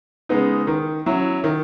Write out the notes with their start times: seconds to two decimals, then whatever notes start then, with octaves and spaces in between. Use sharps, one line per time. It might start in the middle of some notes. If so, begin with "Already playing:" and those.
0.29 C#3 G#3 B3 D#4
0.67 D#3
1.06 F#3 C#4 E4
1.44 D#3